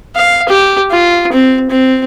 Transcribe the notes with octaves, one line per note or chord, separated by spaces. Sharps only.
F5
G4
F4
C4
C4